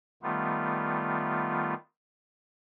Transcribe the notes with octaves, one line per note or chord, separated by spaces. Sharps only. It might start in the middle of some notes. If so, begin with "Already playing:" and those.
D#3 G3 A3 B3 F4